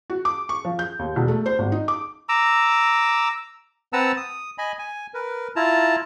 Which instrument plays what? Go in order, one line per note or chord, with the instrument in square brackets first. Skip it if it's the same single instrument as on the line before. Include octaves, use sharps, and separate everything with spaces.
[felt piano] F#4
D6
C#6
F3
G6
D#2
E1
A3
C5
G#1
D#4
D6
[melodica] A#5 D6 E6
[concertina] C4 B4 F#5 A5 A#5 E6
D#6
D#5 G#5 B5
G#5
A#4 B4
E4 F4 A5 A#5